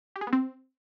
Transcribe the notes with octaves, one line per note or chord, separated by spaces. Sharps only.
G4
G#4
B3
C4